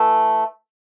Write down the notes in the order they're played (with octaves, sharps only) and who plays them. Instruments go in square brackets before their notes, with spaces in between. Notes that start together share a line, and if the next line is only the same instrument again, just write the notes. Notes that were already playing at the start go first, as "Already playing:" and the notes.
Already playing: [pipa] E3 A3